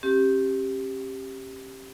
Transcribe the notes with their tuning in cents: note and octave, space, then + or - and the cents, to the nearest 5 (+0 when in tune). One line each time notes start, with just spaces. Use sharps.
C#4 -45 G4 +0